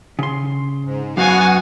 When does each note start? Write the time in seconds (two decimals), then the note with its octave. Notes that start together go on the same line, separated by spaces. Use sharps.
0.19 C#3 C6
0.85 G#2
1.17 F#2 B3 F#4 F5 F#5 G#5